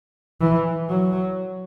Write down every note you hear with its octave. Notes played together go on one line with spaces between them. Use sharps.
E3
F#3